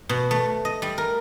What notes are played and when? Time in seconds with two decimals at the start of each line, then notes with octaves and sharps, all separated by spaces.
0.09 B2
0.31 A3
0.65 D#5
0.82 G3
0.98 A#4